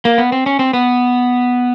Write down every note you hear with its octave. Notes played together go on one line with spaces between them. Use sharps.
A#3
B3
C4
C#4
C4
B3